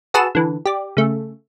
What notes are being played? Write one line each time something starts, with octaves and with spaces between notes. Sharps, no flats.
F#4 G#4 B4 A5 E6
D3 E3
G4 D5
C#3 A3